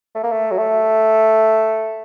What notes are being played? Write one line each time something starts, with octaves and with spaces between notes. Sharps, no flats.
A3
A#3
A3
F#3
A3